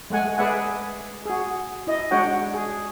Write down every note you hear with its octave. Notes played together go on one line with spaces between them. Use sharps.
G#3 A3 F#5 G#5
G#4 B4 D5 E5 F#5 G#5
F#4 G#4
E4 D#5
G#3 D4 F#4 C#5 F#5 G5
G#4